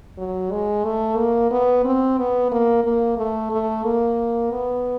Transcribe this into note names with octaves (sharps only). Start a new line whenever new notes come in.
F#3
G#3
A3
A#3
B3
C4
B3
A#3
A#3
A3
A3
A#3
B3